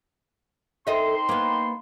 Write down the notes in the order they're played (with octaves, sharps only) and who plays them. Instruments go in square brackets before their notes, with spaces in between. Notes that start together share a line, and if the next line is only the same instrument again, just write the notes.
[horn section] C4 D#4 C6 [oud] A4 D#5 E5
[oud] A#3 B3